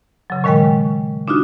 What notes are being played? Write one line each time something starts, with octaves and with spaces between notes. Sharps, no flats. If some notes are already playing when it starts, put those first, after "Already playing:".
C#3 F#3
A#2 D#3 G#3 A#4 G5
D4 D#4 F4 F#4